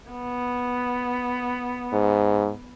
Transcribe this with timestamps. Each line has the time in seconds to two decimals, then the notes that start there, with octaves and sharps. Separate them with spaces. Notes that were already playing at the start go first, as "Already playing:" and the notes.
0.11 B3
1.93 G#2